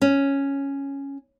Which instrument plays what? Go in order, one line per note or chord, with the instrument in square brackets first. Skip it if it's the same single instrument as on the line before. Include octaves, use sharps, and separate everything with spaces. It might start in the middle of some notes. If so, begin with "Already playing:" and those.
[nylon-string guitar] C#4